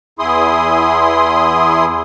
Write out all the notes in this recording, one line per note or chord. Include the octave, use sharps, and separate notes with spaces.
E2 E4 G#4 C6 D#6